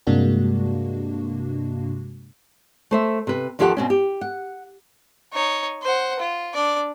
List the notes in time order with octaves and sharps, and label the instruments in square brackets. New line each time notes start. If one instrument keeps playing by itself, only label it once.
[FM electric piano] G2 C3 G#3 A#3 D4 F#4
[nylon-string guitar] A3 C5 E5
C3 B4
D#2 F3 G4 A4 C5 F#5
B2 C4 C#4
G4
F#5
[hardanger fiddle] D#4 C#5
C5 F#5
F4
D4 D5